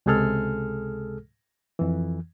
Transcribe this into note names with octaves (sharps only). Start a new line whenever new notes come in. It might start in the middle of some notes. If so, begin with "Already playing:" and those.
C#2 C3 G#3 G#4 A4 F6
F2 E3